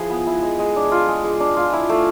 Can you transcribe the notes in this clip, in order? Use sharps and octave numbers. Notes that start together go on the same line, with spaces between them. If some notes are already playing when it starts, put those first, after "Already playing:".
Already playing: F3 E4 G#4 B4
B3
E4
G#3
G#3
D4
F4
G#3
G#3
D4
F4
E4
A3